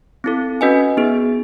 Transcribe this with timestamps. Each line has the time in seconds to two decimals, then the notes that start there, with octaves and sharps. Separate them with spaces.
0.24 C4 E4 A4
0.61 C#4 F#4 B4 D#5 G#5
0.97 B3 D#4 G#4